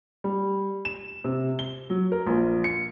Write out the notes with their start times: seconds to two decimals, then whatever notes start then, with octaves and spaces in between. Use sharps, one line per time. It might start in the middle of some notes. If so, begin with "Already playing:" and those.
0.24 G3
0.85 E7
1.24 C3
1.59 G7
1.90 F#3
2.12 A#4
2.27 A#1
2.64 C#7